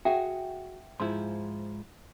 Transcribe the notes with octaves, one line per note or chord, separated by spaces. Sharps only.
F#4 G#4 E5 F#5 G5
G#2 F3 E4 C6